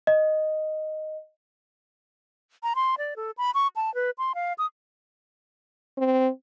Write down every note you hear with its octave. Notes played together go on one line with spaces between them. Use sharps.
D#5
A#5
C6
D5
A4
B5
C#6
A5
B4
C6
F5
D#6
C4